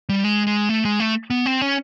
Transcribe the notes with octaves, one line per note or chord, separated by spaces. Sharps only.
G3
G#3
G#3
A3
G#3
A3
B3
C4
C#4